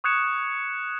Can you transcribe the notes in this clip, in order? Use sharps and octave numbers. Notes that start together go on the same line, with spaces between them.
C#6 D#6 F#6 G#6 C#7 E7